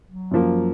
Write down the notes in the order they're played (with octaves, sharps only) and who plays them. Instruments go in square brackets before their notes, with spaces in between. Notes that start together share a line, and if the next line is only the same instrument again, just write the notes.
[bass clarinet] F#3
[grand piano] F#2 F3 A#3